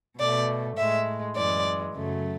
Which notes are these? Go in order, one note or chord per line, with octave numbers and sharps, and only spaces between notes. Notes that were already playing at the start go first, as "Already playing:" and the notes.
B2 A3 D5
A2 G#3 E5
F#2 E3 G#3 D5
F#2 C#3 F#3 A3